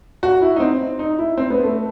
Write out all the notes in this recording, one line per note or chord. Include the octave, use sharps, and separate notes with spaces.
F#4
E4
D#4
C4
D#4
E4
C4
B3
A3